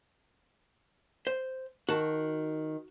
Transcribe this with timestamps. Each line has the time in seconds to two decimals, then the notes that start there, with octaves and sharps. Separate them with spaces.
1.27 C5
1.89 D#3 F#4 A5